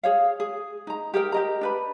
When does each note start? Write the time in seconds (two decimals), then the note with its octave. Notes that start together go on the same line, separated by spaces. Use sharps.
0.03 G#4 C#5 F5
0.40 G#4
0.87 D#4 A#5
1.14 G4 G#4 A#4 G5
1.32 G4 D#5 A#5
1.61 D4 B4 B5